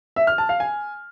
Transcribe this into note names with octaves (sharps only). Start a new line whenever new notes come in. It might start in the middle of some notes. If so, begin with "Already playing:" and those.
E5
F6
A5
F5
G#5